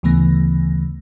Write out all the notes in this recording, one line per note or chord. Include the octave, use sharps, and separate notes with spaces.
D2 C#3 E3 A3 B3 A#6